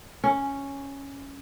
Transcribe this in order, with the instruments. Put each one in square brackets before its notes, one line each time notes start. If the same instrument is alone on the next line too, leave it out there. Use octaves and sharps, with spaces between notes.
[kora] C#4